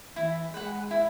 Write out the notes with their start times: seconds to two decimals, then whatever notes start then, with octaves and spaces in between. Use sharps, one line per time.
0.16 E3 E4
0.54 G#3 B4 F#5
0.91 E4